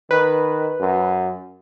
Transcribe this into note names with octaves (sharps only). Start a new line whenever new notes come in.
D#3 B4
F#2